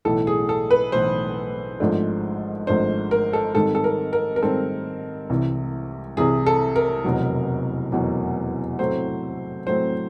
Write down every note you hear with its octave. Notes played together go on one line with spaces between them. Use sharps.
B1 A2 E3 A4
G#4
A4
B4
B1 A2 E3 C5
G#1 G#2 F3 A3 D4
G#1 G#2 F3 A3 D4 C5
A#4
A4
G#2 D#3 G3 C4 A4
A4
A#4
A#4
A#4
G#2 D#3 G3 C4 A4
C2 C3 E3
C2 C3 E3 G#4
A4
A#4
F1 E2 B2 F#3
F1 E2 B2 F#3
A2 F#3 A3 C4 C5
A2 F#3 A3 C4 C5